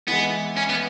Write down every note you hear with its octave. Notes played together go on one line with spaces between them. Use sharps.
E3 G#3 B3 E4
C#4
B3